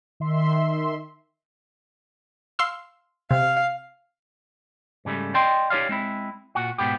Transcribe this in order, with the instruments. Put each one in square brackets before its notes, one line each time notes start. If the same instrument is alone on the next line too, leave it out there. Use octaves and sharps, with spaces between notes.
[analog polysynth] D#3 E5 C6
[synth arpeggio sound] F5 C6 E6
[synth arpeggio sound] C3 [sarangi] F5
[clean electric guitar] G#2 C#3 G3 A3
D5 D#5 G5 C6
D#4 G4 C#5 D5 F5
G#3 C4 E4
A#2 F#4
G#2 B2 B3 G4